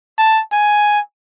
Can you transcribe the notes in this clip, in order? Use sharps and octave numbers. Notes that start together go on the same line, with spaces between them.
A5
G#5